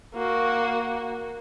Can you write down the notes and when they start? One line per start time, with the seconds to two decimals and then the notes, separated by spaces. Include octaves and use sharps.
0.14 A#3 F#4